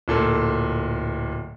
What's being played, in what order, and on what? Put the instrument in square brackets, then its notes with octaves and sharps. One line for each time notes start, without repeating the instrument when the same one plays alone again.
[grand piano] D1 A#2 A4